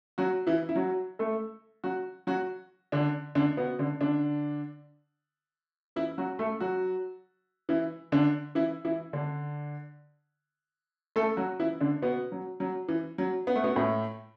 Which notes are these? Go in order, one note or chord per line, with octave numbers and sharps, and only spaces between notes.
F#3 F#4
E3 E4
E4
F#3 F#4
A3 A4
F#3 F#4
F#3 F#4
D3 D4
D3 D4
B2 B3
D3 D4
D3 D4
E3 E4
F#3 F#4
A3 A4
F#3 F#4
E3 E4
D3 D4
E3 E4
E3 E4
D3 D4
A3 A4
F#3 F#4
E3 E4
D3 D4
B2 B3
F#3
F#3
E3
F#3
B3
A3
B2 B3
A2 A3